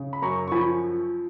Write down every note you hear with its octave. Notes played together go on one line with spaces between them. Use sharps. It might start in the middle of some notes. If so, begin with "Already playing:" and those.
Already playing: C#3
B5
F#2 A#5 C#6
C#6
F3 G#5 B5